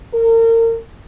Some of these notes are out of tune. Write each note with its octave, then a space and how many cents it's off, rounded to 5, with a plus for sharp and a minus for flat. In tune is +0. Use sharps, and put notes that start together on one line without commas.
A#4 -35